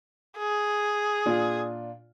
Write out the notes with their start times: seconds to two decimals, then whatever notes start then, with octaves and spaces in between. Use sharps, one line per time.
0.38 G#4
1.26 A#2 D4 F4